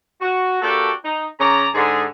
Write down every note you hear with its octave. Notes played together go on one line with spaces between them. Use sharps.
F#4
A#3 D4 F#4 G4 A4 B4
D#4
C#3 C#4 D5 A#5
G#2 D3 G#4